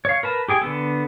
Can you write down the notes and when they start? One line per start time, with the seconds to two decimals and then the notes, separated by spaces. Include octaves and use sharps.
0.05 C#5 F5
0.23 A#4 B4 A5
0.48 G4 G#4 G5 G#5
0.62 D3 B3 A4